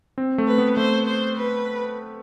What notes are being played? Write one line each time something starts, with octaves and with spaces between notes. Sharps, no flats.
C4
A3
B4
B3
A3 C5
C5
B4